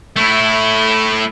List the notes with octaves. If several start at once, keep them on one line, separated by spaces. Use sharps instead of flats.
A3 E4